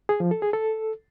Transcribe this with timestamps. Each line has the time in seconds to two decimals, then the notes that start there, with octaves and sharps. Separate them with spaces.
0.09 G#4
0.20 F3
0.31 A4
0.42 G#4
0.53 A4